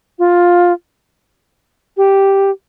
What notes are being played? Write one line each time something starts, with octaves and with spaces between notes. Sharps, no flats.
F4
G4